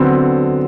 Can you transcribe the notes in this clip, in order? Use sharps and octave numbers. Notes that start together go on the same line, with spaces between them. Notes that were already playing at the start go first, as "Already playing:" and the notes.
Already playing: D3 F#3 B3 C4